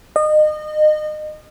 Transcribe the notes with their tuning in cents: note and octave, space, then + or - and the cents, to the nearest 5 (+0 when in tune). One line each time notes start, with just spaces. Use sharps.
D#5 -30